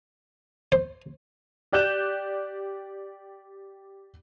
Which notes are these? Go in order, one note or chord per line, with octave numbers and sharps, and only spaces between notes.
C5
G4 D5 F#6 G6 E7